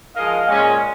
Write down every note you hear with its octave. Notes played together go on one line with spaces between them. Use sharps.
F3 G#3 D#4 A#4 D#5 F5
A#2 G#3 C#4 G#5